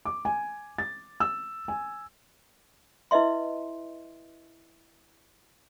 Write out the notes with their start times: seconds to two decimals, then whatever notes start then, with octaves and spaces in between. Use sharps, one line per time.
0.05 D6
0.25 G#5
0.78 A6
1.20 E6
1.68 G#5
3.11 E4 B4 D#5 E5 C6